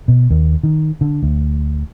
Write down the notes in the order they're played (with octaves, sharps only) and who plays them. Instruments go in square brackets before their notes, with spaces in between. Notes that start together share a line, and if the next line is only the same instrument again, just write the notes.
[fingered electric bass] B2
D#2
D#3
D3
D2